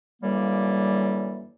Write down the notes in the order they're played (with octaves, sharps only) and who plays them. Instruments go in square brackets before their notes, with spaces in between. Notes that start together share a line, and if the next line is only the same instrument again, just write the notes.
[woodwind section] F#2 D3 E3 G3 A#3